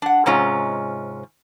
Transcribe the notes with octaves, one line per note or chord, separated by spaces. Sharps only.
D4 F#5
G#2 C3 G#3 C#4 F4